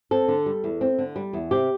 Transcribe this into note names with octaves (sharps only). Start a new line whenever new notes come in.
C4 A4
D3
G3
E2
C4
D3
G3
E2
C3 G4